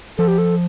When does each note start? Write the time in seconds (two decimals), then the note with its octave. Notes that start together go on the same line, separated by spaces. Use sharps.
0.18 F3 A4
0.28 G4
0.38 A4